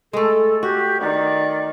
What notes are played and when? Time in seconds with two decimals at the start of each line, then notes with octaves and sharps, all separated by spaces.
0.13 G#3 A3 A4
0.63 F#4 G4
1.01 D#3 D5